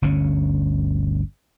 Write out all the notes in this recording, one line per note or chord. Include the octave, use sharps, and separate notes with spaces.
G1 D2 D3 C#4